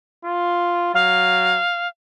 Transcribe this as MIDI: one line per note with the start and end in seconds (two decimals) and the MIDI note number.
0.25 0.91 65
0.94 1.59 54
0.94 1.88 77